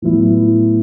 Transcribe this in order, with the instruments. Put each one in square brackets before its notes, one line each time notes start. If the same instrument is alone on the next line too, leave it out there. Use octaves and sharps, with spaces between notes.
[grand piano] A2 F#3 B3 E4